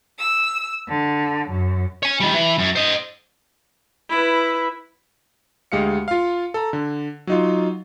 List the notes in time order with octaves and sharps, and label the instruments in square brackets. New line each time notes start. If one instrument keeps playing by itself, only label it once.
[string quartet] E6
D3
F#2
[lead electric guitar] C#5 G#5
D#3 G3
E3
F#2
C5 D#5
[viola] E4 B4
[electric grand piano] D2 G#3 G4 F5 C#7
F4 F5
A4 A#5
D3
F#3 D#4 F4